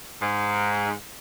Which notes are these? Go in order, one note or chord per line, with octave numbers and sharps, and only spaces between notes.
G#2